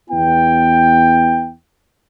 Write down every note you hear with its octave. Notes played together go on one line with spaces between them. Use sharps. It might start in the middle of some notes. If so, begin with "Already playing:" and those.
E2 B3 E4 G5